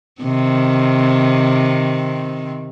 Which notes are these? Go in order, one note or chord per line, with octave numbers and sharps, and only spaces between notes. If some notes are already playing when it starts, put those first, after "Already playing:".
C3 D#3 C4